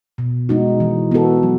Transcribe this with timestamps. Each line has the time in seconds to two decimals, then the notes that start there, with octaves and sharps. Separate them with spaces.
0.18 B2
0.49 G#3 D#4 F#4
0.80 E3
1.11 B3 F#4 A4
1.43 F#3